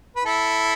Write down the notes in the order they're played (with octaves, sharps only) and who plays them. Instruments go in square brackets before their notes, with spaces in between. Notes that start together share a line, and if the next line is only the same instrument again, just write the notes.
[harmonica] B4
E4 A4